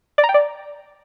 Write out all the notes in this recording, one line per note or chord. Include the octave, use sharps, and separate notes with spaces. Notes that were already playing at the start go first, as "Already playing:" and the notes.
D5
A#5
G5
D5